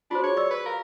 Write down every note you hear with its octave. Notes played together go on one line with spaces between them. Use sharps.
D4 F4 F#4 C5
G#4 C#5
D5 C#6 E6
B4
A#4 F5